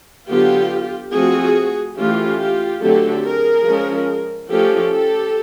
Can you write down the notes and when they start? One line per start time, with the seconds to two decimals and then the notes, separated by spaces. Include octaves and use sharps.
0.29 D3 F#3 B3 F4 G4
1.13 F3 A3 C4 F#4 G#4
1.97 E3 A3 C#4 F4 G4
2.40 F4 G4
2.81 D3 F#3 A3 C4 G4 A4
3.24 G#4 A#4
3.67 F3 G#3 C#4
4.50 F3 A3 C#4 G4 A4
4.92 G4 A4